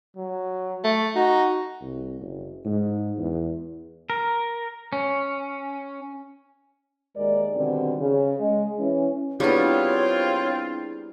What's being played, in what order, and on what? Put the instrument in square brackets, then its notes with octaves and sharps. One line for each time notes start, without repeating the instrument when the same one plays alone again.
[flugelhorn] F#3
[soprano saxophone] A3
[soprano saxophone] D#4 [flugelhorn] F#4
[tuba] C2
F#1
G#2
E2
[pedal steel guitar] A#4
C#4
[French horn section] D#2 G#3 A#4 D5
B2 D3 D#3 G3 C4
C#3
G#3
E3 C#4
[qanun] G3 B3 [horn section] C4 F4 [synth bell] D4 E4 G#4 [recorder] C#5